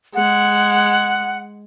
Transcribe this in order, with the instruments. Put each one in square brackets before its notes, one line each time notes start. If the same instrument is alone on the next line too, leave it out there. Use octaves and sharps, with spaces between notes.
[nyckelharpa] G#3 [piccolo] F#5